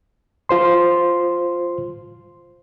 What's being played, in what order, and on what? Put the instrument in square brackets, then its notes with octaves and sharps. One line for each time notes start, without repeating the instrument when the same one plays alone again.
[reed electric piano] F4 C5 C6